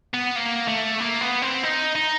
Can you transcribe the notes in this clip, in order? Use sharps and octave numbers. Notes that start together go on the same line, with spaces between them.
B3
A#3
A3
A#3
B3
C4
D#4
D#4